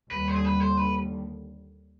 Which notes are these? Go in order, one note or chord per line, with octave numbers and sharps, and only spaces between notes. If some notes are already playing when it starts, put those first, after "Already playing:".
D#2 D3 G3 B4
C5
G#4
B4
C5
B4